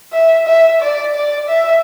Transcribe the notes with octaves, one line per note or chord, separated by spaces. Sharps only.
E5
E5
D5
D5
E5